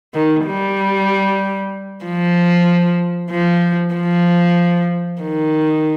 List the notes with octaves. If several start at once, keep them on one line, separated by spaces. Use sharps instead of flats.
D#3
G3
F3
F3
F3
D#3